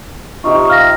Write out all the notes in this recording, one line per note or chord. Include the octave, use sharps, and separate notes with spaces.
C3 D#4 F4 C#6
F5 F6 A#6